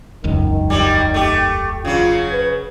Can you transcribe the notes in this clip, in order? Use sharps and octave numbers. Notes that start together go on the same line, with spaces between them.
E1 C#2 F#2 D#3
F#3 G3
A3 G4
C#3 F#3 F4
B4